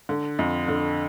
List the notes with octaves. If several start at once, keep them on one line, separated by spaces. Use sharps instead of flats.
D3
F2
D3